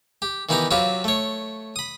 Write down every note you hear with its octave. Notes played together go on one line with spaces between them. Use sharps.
G4
D#3 E3 B3 D#4 G4 D#5
F#3 C4 F4 G4 B4
A3 C#5
B5 D#6